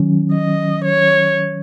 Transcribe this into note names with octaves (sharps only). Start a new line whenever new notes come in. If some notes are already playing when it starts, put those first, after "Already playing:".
Already playing: D#3 F#3 C#4
D#5
C#5